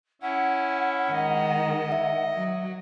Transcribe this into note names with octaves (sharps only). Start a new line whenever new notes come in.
C#4 E4 F#5
D#3 G#3 D#5
E5
F#3